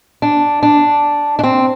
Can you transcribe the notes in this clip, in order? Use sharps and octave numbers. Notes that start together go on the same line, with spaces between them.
D4
D4
D4
C4